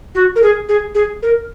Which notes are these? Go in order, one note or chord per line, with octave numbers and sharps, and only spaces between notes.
F#4
A#4
G#4
G#4
G#4
A#4